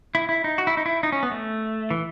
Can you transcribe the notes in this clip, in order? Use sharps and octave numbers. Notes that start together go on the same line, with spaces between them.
E4
E4
D#4
F#4
E4
D#4
E4
D#4
C#4
B3
A3
E3